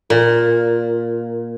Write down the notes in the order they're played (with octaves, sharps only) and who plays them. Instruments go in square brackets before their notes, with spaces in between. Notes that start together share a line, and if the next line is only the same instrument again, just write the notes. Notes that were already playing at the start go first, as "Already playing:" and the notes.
[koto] A#2